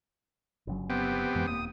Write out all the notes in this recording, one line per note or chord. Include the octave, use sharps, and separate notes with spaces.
G1 C#3 F#3
B3 C4 G4
F2 E3 G#3
D#1 A#3 D#6